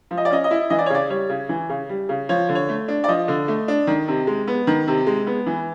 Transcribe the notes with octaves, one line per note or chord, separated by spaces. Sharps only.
F3
D#5
D5
C#4 D#5
D#5
E4
E3 D#5
D5
C#5
C#3 D5
G3 C#5
C#3
E3
C#3
G3
C#3
F3 C#5
D3
C#5
A3
D4
D5
F3 D#5
D3
A3
D4
D#3
C3
G#3
B3
D#3
C3
G#3
B3
E3